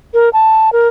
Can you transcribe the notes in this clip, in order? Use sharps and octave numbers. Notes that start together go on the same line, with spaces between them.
A#4
A5
A#4